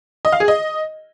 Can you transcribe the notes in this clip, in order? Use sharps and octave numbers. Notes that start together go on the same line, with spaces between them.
D#5
F5
G#4
D#5